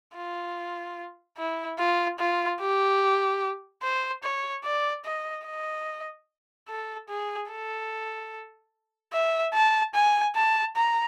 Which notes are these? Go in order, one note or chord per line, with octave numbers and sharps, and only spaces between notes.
F4
E4
F4
F4
G4
C5
C#5
D5
D#5
D#5
A4
G#4
A4
E5
A5
G#5
A5
A#5